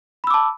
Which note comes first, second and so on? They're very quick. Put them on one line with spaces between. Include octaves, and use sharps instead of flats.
B5 E6 D6 A5